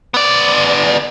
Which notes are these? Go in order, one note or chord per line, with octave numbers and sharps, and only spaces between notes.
B3 D5